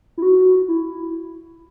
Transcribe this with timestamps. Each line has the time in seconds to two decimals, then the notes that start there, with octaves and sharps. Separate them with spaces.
0.18 E4
0.22 F#4
0.68 E4